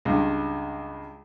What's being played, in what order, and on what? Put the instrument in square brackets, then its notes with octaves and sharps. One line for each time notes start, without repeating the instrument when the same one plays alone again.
[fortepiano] C#2 G2